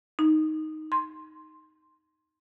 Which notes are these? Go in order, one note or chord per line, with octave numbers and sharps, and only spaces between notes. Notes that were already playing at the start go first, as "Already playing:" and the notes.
D#4
C6